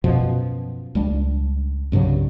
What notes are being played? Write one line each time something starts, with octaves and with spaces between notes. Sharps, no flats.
F#2 B2 F3
C#2 G3 A3 D4
C2 G2 C#3 F#3